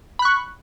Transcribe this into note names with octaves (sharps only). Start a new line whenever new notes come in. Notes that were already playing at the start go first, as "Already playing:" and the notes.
B5 C#6 F#6